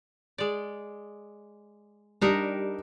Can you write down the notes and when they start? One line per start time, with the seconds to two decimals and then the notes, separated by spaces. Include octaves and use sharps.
0.38 G#3 D5
2.21 G3 D4 D#4 A#4